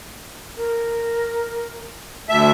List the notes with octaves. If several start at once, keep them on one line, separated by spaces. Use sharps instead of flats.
A#4
D2 E5 A5